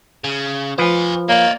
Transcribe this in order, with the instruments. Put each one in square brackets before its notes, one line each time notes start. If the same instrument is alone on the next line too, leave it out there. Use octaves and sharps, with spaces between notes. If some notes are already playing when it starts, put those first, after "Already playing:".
[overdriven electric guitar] C#3
[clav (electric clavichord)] F3 B4 [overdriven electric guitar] C5 G#5
[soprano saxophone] A#3 [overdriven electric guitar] C#5 D5